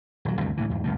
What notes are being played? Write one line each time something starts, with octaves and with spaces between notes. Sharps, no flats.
D#1 F#3
D2 G2 C3 A3
D2 A2 D3 E3
E2 G#2
D2 G2 B2 A3